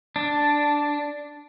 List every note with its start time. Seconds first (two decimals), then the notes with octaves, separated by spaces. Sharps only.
0.16 D4